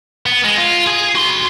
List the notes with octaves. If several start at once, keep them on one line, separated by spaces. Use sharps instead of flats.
B3
G#3
F4
G#4 G#5
F#4 C6